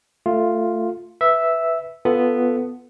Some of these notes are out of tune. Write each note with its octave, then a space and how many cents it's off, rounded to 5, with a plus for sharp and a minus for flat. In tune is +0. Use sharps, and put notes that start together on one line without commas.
A3 +15 F4 +0
B4 +0 E5 -5
B3 +0 F4 -10 A4 +0